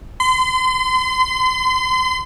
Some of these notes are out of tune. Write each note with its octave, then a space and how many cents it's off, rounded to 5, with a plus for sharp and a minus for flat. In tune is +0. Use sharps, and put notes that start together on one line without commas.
C6 -35